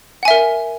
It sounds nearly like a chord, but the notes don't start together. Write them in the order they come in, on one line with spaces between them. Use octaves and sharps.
F#5 G#5 E5 A#4